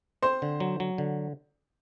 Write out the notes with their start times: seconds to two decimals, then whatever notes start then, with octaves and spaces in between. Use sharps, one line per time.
0.22 C4 C5 C6
0.42 D3
0.60 F#3
0.80 F#3
0.98 D3